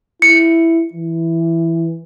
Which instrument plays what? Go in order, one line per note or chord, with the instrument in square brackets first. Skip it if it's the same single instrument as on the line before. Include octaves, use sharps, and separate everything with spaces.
[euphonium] E4 [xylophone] C#7
[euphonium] E3